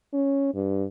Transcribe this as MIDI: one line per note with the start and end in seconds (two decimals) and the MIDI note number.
0.13 0.51 61
0.54 0.85 43